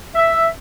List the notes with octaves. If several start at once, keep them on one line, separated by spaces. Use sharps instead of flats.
E5